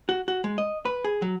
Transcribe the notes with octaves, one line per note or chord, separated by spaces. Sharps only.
F#4
F#4
G#3
D#5
B4
G#4
F#3